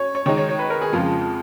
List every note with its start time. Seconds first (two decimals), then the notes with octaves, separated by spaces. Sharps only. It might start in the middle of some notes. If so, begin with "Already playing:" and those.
Already playing: C#4 C#5
0.15 C#5
0.26 D#3 G#3 D#4 C#5
0.37 C#5
0.49 C#5
0.59 B4
0.70 A#4
0.81 G#4
0.93 F2 C#3 F3 G#3 F4